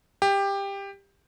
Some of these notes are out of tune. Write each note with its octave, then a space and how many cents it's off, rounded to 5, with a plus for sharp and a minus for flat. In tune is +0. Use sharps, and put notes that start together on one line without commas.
G4 +15